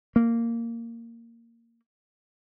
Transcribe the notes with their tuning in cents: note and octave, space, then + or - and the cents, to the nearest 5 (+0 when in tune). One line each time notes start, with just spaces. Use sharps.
A#3 -10